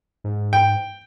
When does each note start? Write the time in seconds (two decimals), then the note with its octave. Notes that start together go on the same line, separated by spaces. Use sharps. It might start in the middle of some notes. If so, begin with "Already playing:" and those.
0.24 G#2
0.53 G5